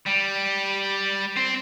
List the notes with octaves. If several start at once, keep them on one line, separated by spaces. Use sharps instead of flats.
G3
C4